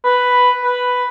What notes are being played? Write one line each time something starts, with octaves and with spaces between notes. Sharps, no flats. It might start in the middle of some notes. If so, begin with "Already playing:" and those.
B4
B4